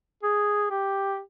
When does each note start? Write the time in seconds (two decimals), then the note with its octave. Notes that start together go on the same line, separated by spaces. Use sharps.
0.23 G#4
0.70 G4